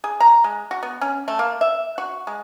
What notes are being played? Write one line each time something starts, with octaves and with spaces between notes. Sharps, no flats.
G#4
A#5
G#3
F#4
B3
C#4
A3
A#3
E5
F#4
G#3